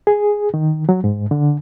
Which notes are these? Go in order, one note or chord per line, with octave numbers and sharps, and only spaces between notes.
G#4
D#3
F#3
G#2
D3